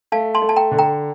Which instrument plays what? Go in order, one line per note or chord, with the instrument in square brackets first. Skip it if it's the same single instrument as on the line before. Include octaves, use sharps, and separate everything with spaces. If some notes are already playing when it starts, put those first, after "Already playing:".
[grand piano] A3 [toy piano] F5 A5
[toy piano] A5 C6
[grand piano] A3
[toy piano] A5
G5 A#5
[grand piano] D3
[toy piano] G5 A#5